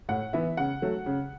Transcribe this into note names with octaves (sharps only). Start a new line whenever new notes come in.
A2 F#5
E3 B3 E5
C#3 F#5
F#3 A3
C#3